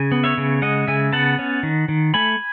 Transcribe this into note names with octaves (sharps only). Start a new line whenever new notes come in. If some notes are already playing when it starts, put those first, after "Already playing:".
Already playing: C#3 G#5
B3
C#5 E5
C#3
G#3 D#5 F#5
C#3 E5 G#5
B3 F#5 A5
C#4
D#3
D#3
A3 G#5 B5